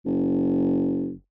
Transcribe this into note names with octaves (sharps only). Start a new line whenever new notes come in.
F#1